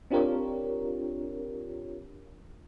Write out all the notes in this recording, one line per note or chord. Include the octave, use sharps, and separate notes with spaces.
C4 D4 F4 G4 A#4 C#5